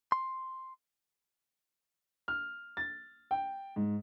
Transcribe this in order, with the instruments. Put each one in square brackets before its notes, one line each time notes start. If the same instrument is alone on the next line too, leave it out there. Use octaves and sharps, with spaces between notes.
[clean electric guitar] C6
[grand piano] F6
A6
G5
G#2